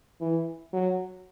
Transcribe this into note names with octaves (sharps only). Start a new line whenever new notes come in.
E3
F#3